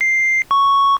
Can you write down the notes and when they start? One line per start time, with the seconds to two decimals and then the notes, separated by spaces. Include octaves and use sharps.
0.01 C7
0.51 C#6